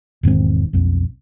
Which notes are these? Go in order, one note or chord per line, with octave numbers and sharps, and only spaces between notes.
E1 G#2 D#3 C4
B1 F2